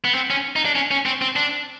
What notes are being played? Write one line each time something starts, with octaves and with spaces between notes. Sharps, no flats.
B3
C4
C#4
D#4
D4
C#4
C#4
C4
C4
D4